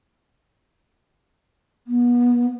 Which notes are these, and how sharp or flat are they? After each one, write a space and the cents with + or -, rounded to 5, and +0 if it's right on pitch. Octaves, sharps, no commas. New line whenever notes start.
B3 -30